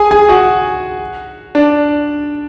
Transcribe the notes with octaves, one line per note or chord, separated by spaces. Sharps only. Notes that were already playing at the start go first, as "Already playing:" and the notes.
Already playing: G#4 G#5
G#4 G#5
F#4 F#5
D4 D5